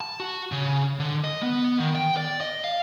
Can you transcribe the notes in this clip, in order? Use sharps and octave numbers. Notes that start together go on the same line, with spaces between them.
A5
F#4
C#3
D3
D#5
B3
D#3
G5
D5
D#5
F5